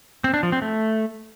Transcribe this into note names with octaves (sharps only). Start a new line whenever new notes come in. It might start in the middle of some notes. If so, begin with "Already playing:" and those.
C4
D4
F3
C4
A3